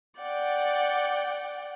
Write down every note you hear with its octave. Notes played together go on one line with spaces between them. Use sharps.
D5 F#5 G5